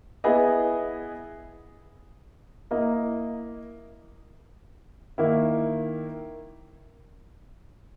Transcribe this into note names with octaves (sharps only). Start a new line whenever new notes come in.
B3 E4 G#4 D#5
A#3 E4 A#4 D#5
D#3 A#3 E4